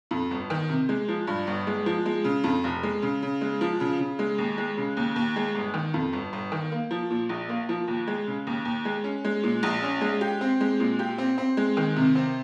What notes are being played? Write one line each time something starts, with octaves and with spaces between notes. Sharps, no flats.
F2
G1
D#3
C3
G#3
F3
G2
G1
G#3
F3
G#3
C#3
F2
F1
G#3
C#3
C#3
G#3
F3
C#3
C#3
G#3
D#2
G#3
C#3
D#2
D#2
G#3
G1
D#3
F2
G1
G1
D#3
A#3
F3
A#2
A#1
A#3
F3
D#2
G#3
C#3
D#2
D#2
G#3
C#4
G#3
A#2
A#1
C#4
G#3
G4
C4
G#3
A#2
G4
C4
C4
G#3
D#3
C3
C4